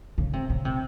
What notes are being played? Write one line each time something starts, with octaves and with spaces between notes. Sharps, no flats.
C#3
C3
C#3
C3